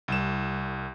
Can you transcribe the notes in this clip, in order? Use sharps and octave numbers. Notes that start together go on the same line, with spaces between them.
C2 E7